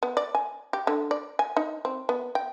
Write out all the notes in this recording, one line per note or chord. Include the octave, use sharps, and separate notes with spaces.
B3
D5
G#5
G4
D3
D5
G#5
D#4
C4
B3
G5